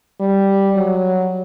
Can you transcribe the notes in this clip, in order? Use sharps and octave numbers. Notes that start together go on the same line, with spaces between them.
G3
F#3